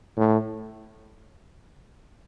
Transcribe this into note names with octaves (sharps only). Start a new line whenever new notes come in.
A2